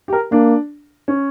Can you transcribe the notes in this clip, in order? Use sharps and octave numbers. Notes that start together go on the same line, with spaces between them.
G4
A#4
A#3 D4
C#4